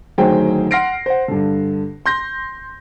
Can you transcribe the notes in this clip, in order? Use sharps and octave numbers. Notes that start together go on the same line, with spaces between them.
D2 D#3 F#3 G#4 C5 G5
F#5 C6 F6 A#6 C7 D7
C5 F#5
G2 D3
C6 G6 A#6